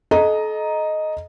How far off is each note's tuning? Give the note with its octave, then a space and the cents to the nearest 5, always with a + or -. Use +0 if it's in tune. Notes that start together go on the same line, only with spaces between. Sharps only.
A4 -35 D#5 +0 A#5 +0